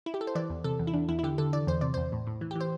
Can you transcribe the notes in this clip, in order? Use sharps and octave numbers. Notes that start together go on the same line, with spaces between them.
E4
G4
A4
C5
E3 D5
E2
C3 A4
E2
E4
E2 D4
E2 E4
E4
D3 G4
D3 A4
E3 D5
E2 C5
C3 D5
E2 C5
A2
A2
E3
G4
E3
C5